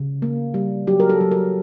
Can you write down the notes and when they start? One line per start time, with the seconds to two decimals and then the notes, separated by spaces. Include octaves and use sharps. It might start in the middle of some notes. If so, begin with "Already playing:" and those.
Already playing: C#3
0.22 A#3
0.54 G3
0.87 F#3 G4
1.00 A#4
1.10 A4
1.21 F#3
1.31 A#4